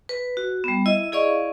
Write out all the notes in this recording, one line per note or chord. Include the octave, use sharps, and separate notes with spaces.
B4
F#4
G3 B3
E4 D#5 E5
E4 G#4 D5 D#5 F5 C#6